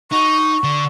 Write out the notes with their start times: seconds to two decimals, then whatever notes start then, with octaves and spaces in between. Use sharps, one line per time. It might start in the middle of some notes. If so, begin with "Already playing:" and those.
0.12 D#4 C#6
0.64 D3